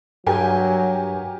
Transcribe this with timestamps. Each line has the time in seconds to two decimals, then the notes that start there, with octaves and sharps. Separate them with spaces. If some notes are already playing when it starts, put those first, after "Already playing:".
0.26 G2 F#3 G4 A#4 G#5